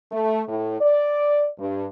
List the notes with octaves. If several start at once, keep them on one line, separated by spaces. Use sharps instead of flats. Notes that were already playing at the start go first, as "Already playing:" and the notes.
A3
A2
D5
G2